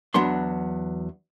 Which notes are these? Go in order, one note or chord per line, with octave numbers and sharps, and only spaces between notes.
E2 F#3 B3 D4 C6